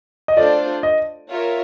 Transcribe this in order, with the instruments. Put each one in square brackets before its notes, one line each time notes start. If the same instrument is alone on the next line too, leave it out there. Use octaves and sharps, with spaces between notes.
[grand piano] D#5
[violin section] A3 D4 F4 A4 C5 [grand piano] D5
[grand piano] D#5
[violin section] F4 A#4 C#5 E5